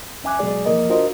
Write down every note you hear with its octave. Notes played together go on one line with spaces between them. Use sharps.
E2 C#4 E5 G#5 D6 F#6
B2 F#3 G#3 G#4 D5
E3 F3 A#3 A#4 D#5
D4 F4 F#4 A#4 C5 D#5